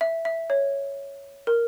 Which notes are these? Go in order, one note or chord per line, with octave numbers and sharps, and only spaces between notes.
E5
E5
C#5
A#4